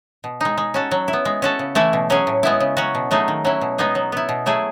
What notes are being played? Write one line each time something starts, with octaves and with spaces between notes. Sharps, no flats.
B2
G#3 D#4
G#3
C#4 F#4 A4
F#3
E4
B3
G#3
C#4 F#4 A4
C#3
E3 A3 E4
B2
F#3 C#4 G#4
A2
G#3 B3 E4
C#3
F#3 C#4 F#4
B2
F#3 A3 D#4 G#4
D#3
F#3 C#4 E4
B2
G#3 B3 D#4 G#4
F#3
B3 E4
B2
F#3 A3 E4 G#4